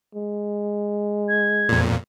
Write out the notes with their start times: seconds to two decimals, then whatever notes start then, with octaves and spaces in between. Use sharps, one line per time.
0.15 G#3
1.28 G#6
1.69 F2 A#2